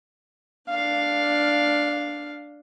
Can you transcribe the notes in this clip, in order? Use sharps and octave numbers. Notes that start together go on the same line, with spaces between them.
D4 F5